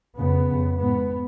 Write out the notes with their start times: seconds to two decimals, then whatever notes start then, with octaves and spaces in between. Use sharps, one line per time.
0.18 F2 C#3 B3
0.49 F2 C#3
0.81 G#2 B3